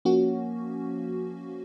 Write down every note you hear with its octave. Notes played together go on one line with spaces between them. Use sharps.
F3 A#3 C#4 F#4